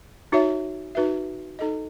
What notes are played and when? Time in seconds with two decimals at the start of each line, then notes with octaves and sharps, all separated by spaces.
0.32 D#4 F#4 C#5 E5
0.95 D#4 F#4 B4 E5
1.59 D#4 A4 D#5